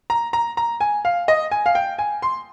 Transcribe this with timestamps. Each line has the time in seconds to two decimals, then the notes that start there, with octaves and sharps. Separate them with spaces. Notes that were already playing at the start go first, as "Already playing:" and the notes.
0.10 A#5
0.33 A#5
0.57 A#5
0.81 G#5
1.05 F5
1.28 D#5
1.51 G#5
1.66 F5
1.75 G5
1.99 G#5
2.22 C6